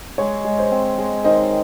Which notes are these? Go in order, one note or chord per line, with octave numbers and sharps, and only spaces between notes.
G#3 C#5
G#3
C5
C4
G#3
D#3 C5 D#5